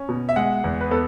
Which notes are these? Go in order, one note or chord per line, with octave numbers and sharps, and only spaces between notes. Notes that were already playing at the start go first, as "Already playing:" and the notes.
Already playing: C#4
B2
E5
G#3 F#5
E2
B4
B3 A4